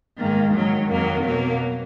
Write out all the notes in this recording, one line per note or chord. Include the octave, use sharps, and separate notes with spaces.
G#2 D#3 A#3
G#2 D#3 F#3
F2 D#3 F#3 A#3
B2 F#3 A#3